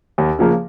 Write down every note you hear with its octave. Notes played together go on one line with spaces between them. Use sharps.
D#2
C#3 F3 A#3